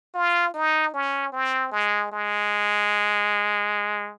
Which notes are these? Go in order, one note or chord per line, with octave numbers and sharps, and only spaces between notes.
F4
D#4
C#4
C4
G#3
G#3